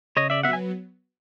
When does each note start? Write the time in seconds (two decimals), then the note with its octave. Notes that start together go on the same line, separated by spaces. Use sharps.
0.17 C#3 C#5 D#5
0.30 D5 E5
0.43 F#3 B3 E5 F#5
0.53 G#5